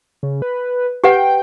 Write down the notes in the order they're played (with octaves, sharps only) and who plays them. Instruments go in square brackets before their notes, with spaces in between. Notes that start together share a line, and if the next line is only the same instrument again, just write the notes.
[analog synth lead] C#3
B4
[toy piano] G4 B4 F#5 [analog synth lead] G5